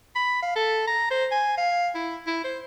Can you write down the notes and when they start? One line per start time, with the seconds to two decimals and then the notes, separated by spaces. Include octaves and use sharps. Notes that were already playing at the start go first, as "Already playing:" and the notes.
0.15 B5
0.42 F5
0.56 A4
0.87 A#5
1.11 C5
1.31 G#5
1.58 F5
1.95 E4
2.27 E4
2.44 C5